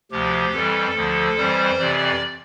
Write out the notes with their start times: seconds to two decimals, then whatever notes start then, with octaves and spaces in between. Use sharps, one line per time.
0.11 D2 C3 F3 G4
0.53 F2 E3 G3 A4
0.95 D2 D3 F3
1.37 F2 E3 G3 C5
1.78 F2 C3 E3 D5